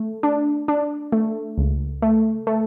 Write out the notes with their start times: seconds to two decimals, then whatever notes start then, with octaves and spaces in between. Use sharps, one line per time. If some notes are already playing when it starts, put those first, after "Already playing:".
Already playing: A3
0.23 D4
0.68 D4
1.12 A3
1.58 C#2
2.02 A3
2.47 A3